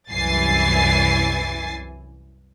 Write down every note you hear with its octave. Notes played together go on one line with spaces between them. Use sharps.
C2 F#2 E3 G#5 A6 C7